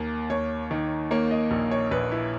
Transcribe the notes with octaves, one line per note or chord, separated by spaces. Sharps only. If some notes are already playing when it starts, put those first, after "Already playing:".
Already playing: D#2 A#3
D#2 C#5
D#3
A#3 C#5
D#5
A#1
C#5
A#1 B4
E4